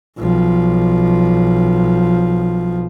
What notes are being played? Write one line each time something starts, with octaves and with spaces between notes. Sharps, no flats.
B1 F3